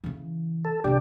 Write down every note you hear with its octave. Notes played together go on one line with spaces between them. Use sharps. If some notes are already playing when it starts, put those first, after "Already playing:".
C#3 E3
A4
C3 D#3 D4 G4